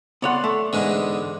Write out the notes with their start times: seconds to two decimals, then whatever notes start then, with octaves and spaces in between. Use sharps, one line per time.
0.22 B3 C#5 D5 F#5 C6
0.44 A3
0.73 E2 G#2 D3 G#3